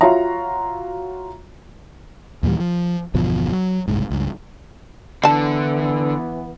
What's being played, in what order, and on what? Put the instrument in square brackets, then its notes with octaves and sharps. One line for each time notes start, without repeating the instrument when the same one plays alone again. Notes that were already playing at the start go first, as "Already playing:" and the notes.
[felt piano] F4 F#4 C#5 E5 A#5
[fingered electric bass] D#2 A#2 E3 G3
F3
G1 E2 B2 F3
F#3
F#1 C2 G#2
C#2 G2
[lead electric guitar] D3 [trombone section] E3 B3 [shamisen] D4 A5